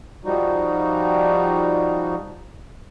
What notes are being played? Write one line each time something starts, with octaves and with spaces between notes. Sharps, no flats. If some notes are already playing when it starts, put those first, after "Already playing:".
F3 G3 D#4 F#4